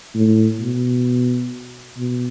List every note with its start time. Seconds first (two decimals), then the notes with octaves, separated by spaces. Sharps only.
0.15 A2
0.60 B2
1.98 B2